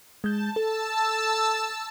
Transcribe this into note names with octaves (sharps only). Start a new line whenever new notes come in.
G#3 A5 G6
A4 A5 E6